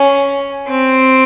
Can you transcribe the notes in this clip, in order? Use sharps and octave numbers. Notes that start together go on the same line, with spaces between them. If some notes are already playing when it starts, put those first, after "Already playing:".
Already playing: C#4
C4